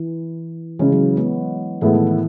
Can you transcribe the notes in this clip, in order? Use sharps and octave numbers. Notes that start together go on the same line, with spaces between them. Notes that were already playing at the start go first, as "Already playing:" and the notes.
Already playing: E3
C#3 E3 G#3 C#4 G#4
F#3
G#3 B3
A2 E3 G#3 B3 E4 A4
D#3
E3